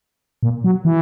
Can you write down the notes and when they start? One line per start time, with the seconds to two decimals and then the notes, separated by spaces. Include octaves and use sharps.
0.43 A#2
0.64 F#3
0.85 E3